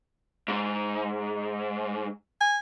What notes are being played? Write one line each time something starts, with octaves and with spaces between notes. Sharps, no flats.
G#2
G#5